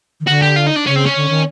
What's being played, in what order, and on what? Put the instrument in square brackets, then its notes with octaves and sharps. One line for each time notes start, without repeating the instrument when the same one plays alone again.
[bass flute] D#3
[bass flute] D3 [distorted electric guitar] F#4
[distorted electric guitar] G4
F4
D#4
D4
[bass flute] C#3 [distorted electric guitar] C#4
[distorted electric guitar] C4
C#4
[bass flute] D3
D#3